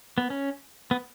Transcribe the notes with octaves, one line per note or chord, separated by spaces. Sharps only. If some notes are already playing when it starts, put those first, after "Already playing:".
B3
C#4
B3